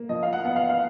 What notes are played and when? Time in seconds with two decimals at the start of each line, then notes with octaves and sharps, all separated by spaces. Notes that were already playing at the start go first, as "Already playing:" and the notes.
Already playing: A#3
0.09 F3 D#5
0.23 F5
0.33 F#5
0.44 B3 F#5
0.56 F5
0.69 F5